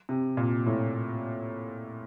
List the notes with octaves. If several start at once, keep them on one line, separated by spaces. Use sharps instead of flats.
C3
A#2
A2